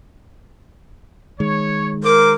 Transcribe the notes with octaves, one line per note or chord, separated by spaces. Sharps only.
D#3 G#3 C#5
A#4 C5 D6